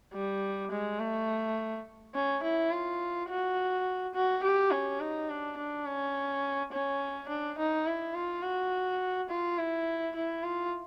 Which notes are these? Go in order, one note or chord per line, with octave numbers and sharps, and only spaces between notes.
G3
G#3
A3
C#4
E4
F4
F#4
F#4
G4
C#4
D#4
D4
D4
C#4
C#4
D4
D#4
E4
F4
F#4
F4
E4
E4
F4